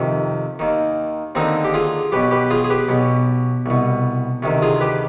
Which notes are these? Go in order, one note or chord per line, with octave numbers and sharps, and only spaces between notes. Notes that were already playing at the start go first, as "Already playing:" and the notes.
Already playing: F2 C3 D#3
D#2 D#3
D#2 D3 C4 D#4
G4
F4 G#4
B1 B2 G4 B4
G4 B4
F4 G#4
G#4
G4 B4
B1 B2
C2 B2
D2 C3 D#3
F4 G#4
G4 B4